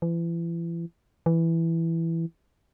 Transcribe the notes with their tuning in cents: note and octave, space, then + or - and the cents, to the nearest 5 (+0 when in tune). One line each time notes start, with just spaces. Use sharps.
E3 +35
E3 +5